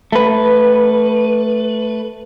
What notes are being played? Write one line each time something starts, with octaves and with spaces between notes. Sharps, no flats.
A3 B4